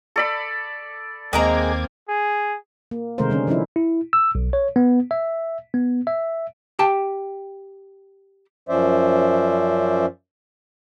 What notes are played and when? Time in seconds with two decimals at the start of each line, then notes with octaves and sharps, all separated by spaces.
0.16 A4 D5 B5
1.33 D#2 G#3 A#3 C4 A#4 A#5 D6 G#6
2.09 G#4
2.91 A#3
3.18 C3 D#3 G#3 A3 A#4 C5
3.30 D3 G3 C#4
3.47 E3 F3 C#4 D#4 E4
3.76 E4
4.13 E6
4.35 B1
4.53 C#5
4.76 B3
5.11 E5
5.74 B3
6.07 E5
6.79 G4 G5 A5
8.69 F#2 F3 C#4 C5 D5 E5